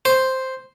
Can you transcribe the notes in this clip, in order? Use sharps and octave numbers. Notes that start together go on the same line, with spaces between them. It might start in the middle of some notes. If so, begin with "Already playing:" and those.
C5